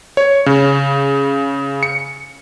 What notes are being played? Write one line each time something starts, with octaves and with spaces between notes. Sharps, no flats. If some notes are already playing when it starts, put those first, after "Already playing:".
C#5
C#3
C#7